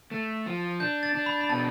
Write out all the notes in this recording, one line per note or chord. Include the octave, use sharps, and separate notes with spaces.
A3
F3
D4 G6
A6
D4
B5
B5
B2 A5